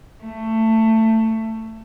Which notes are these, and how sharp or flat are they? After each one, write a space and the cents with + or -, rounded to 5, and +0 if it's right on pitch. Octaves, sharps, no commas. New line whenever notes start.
A3 +20